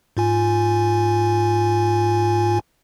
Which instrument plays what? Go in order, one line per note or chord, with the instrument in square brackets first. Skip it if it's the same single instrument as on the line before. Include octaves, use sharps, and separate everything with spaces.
[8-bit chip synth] G#2 F4 G#5